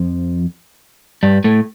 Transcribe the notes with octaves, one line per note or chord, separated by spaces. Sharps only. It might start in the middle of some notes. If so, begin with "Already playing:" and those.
Already playing: F2 F3
G2 G3
A2 A3